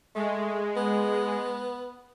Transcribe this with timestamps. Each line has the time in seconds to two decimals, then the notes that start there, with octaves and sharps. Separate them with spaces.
0.15 G#3 A3
0.76 B3